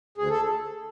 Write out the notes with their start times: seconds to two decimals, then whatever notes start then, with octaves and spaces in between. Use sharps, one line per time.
0.18 D2 G#4
0.30 A4